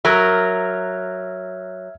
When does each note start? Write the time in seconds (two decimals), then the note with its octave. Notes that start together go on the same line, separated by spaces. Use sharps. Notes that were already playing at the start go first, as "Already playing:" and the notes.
0.05 F#3 A#4 E5 F6 G#6